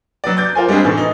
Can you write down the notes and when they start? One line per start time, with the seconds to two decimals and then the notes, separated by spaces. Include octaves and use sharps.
0.24 F#3 B4 D5
0.37 D6 G6 A6
0.55 F4 A#4 C5 G#5
0.68 G3 G#3 C4 D4 G#4
0.85 A2 E3
0.97 D#4